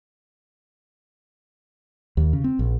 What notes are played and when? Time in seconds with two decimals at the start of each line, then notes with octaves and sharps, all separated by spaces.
2.17 D#2
2.33 C#3
2.44 C4
2.59 A#1